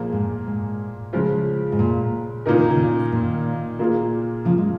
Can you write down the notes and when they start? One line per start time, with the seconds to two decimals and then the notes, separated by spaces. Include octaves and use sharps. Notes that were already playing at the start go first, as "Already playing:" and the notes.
Already playing: A#2 F3 A#3 F4 G#4
0.12 G#2
0.47 G#2
1.13 C#3 F3 G#3 F4
1.72 G#2
1.79 A#2
2.46 A#2 C#3 A#3 D#4 A#4
2.58 D#3
2.71 C#3
3.12 A#2 D#3
3.79 A#2 A#3 F4 G#4
4.45 C#3 F3
4.58 G#3